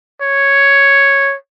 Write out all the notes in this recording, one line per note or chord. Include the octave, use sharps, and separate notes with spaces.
C#5